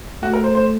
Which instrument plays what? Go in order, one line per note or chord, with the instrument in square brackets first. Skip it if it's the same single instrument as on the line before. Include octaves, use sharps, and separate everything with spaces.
[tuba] A3 [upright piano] F#4
[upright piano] A#4
C5
C5